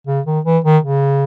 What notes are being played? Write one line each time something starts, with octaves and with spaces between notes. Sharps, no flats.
C#3
D#3
E3
D#3
C#3